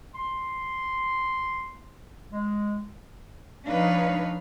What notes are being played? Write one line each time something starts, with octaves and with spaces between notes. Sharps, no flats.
C6
G#3
F3 D4 D#4 B4 C#5 F5